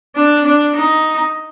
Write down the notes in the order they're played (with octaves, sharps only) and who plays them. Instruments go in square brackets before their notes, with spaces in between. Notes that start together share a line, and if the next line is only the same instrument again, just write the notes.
[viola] D4
D4
D#4